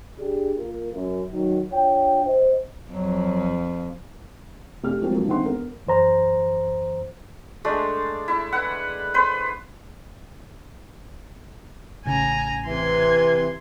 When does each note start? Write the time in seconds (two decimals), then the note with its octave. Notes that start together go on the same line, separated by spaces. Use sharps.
0.18 D4 G4 G#4
0.56 A#3 F4 A#4
0.93 F#2
1.31 D#3 F#3
1.71 D4 F4 C#5 G5
2.25 C5 D#5
2.91 F2 F#3
4.84 F1 G4 F6
5.02 F3 F#3 G#3 A#3 C4 F4
5.15 G2 F3 F#3 A#3
5.28 D#3 E3 C4 C5 F#5 C6
5.43 B3 A#4
5.87 F#2 E3 C5 A#5
7.65 G#3 A3 D4
8.28 E4
8.52 B4 F#5
9.14 B4 C5
12.05 A1 C#3 G#5 A#5
12.66 C3 E3 C6 G#6